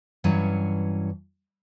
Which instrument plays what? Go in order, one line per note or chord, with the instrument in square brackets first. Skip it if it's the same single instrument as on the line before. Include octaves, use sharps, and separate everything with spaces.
[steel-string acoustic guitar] G2 E3 F#3 C#4